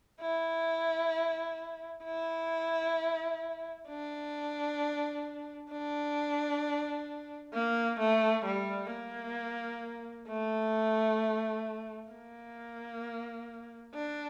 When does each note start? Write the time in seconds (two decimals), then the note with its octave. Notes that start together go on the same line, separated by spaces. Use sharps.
0.21 E4
2.04 E4
3.88 D4
5.71 D4
7.54 A#3
8.00 A3
8.45 G3
8.91 A#3
10.29 A3
12.11 A#3
13.95 D4